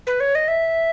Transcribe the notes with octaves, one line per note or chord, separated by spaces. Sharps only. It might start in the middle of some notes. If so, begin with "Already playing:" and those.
B4
C#5
D#5
E5